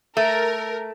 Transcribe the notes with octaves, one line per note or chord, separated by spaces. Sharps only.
A3 A#4